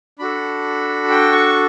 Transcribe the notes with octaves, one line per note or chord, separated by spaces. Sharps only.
D4 F#4 A4 B5
G5
C#6